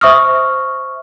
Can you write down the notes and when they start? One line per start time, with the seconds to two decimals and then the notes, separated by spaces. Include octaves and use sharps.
0.01 C5 E5 C#6 D#6 F6